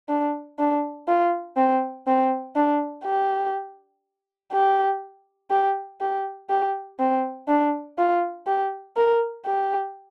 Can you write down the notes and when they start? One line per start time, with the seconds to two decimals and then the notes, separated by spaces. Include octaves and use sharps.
0.09 D4
0.59 D4
1.08 F4
1.57 C4
2.07 C4
2.56 D4
3.05 G4
4.52 G4
5.51 G4
6.01 G4
6.50 G4
6.99 C4
7.48 D4
7.98 F4
8.47 G4
8.96 A#4
9.45 G4